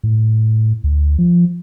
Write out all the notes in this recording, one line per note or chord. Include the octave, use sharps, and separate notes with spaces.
A2
D2
F3